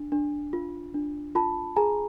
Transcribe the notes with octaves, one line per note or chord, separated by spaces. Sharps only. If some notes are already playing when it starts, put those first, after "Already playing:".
Already playing: D4
D4
F4
D4
F4 A5 B5
G#4 G#5 A#5